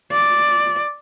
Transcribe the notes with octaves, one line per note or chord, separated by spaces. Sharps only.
D5